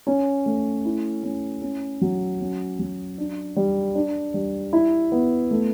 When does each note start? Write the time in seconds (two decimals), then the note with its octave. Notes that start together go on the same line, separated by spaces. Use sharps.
0.07 C#4
0.46 A3
0.85 E4
1.23 C#4
1.62 C#4
2.01 F#3
2.40 C#4
2.79 F#3
3.18 D4
3.56 G3
3.95 D4
4.34 G3
4.73 E4
5.12 B3
5.51 A3